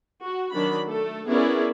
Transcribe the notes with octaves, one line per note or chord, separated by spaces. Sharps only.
F#4
D#3 F#3 D4 B5
A3 A4
B3 C#4 E4 G#4 A#4 D5